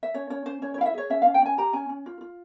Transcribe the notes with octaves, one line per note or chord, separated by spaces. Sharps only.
E5
C#4 C#5
C#4 C#5
C#4 C5
C#4 C#5
C#5
E4 F5
E5
G#4 C#5
C#4 E5
C#4 F5
G5
C#4 G#5
G4 A#5
C#4 G#5
C#4
F4
F4